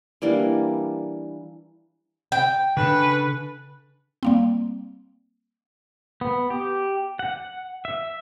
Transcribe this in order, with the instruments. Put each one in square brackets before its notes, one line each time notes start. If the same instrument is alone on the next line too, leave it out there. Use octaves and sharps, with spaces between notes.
[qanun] E3 G3 A#3 D4
[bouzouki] G5
[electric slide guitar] C#3 D4 A4 [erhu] B4
[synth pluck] G3 A#3 C4
[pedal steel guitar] B3
G4
F#5
E5